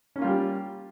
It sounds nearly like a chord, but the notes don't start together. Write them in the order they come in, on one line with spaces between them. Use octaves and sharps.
C#4 A#3 F4 G3 G4